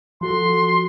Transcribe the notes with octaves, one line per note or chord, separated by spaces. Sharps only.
F3 F#4 A4 C6